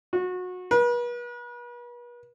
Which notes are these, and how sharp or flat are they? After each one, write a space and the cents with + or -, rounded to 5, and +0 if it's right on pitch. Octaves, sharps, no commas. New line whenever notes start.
F#4 -25
B4 -40